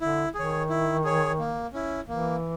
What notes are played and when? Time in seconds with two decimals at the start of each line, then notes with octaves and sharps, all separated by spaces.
0.01 D3 E4
0.35 D#3 G#4 C#5
0.69 E4
1.04 G#4 C#5
1.39 A#3
1.73 C#4 E4
2.08 E3 A#3